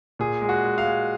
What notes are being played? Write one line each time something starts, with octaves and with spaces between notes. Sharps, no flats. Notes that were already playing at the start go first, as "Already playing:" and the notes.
A#2 G#4
G#3
F#4
G#3
F5
G#3